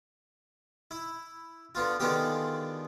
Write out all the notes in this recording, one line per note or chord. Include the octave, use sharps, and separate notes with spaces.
E4
D3 B3 F4
D3 D#3 G#3 B3 F4 G4